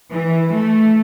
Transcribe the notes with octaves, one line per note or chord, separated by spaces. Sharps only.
E3
A3